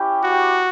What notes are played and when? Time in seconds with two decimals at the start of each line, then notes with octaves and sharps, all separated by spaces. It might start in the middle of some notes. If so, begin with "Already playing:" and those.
Already playing: C#4 E4 G4
0.23 F#4